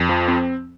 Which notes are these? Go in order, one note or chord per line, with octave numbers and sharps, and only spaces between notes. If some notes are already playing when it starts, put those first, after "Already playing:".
Already playing: F2
F3
C4